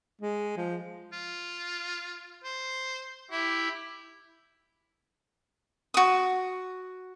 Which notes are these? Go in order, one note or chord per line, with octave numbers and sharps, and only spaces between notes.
G#3
F3
F4
C5
E4 G4
F#4 D#6